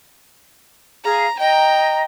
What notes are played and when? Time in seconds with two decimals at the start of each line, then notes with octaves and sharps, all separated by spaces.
1.04 G#4 F5 A#5
1.40 D#5 G5 A#5